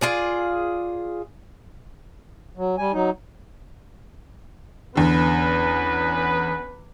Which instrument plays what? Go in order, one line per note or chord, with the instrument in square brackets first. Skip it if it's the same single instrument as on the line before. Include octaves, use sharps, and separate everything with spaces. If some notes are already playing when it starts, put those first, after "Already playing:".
[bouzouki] F4 G#4 D5
[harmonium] F#3
G3 G#5
F#3 D#4
[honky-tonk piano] E2 D3 [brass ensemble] B3 C#4 B4